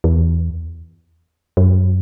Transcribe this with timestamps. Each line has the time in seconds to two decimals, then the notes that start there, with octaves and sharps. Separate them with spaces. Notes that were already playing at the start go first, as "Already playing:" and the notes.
0.04 E2
1.57 F#2